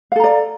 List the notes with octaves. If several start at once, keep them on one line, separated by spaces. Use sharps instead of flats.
A4 D5 F5 A#5